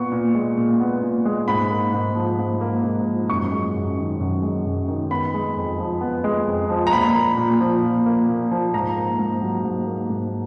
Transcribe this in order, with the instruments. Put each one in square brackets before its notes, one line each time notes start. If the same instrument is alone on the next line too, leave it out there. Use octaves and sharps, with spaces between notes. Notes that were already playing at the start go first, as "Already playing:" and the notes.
Already playing: [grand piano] A#2 B3 C#6
A#2
G#3
A#2
B3
A#2
G#3
G#2 B5
A#3
G#2
F3
G#2
A#3
G#2
F3
F#2 C#6
G#3
F#2
D#3
F#2
G#3
F#2
D#3
B3 B5
G#3
F2
F3
B3
G#3
F2
F3
A#5
A#2 B5
A#3
A#2
F3
A#2
A#3
A#2
F3
G#2 A#5
A#3
G#2
F#3
G#2
A#3
G#2